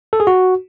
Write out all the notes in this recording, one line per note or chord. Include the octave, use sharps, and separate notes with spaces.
A4
G#4
F#4